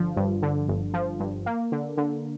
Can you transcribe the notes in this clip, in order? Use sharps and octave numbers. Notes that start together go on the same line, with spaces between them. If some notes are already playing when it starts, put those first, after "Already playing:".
Already playing: G1 D3 F3
G2
D3
G1
F3
G2
A#3
D3
D3